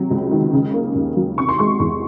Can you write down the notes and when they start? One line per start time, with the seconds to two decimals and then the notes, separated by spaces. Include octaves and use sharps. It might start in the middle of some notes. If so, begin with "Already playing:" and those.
Already playing: C3 F#3
0.11 C#2
0.31 D#3
0.53 C#3
0.73 A#3
0.95 D#2
1.16 F#3
1.38 C3 C#6
1.49 C6
1.59 G#3 C#6
1.80 E2 C6